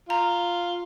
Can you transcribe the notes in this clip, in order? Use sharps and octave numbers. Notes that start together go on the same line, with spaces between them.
F4 A#5